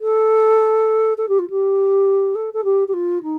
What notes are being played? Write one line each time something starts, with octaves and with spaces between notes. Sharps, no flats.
A4
A4
G4
F4
G4
A4
A4
G4
G4
F4
D#4